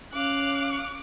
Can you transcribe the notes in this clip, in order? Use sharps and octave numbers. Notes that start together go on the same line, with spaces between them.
C#4 F5 D6 F#6